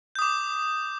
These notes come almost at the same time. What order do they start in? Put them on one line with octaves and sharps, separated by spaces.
G6 D#6 D6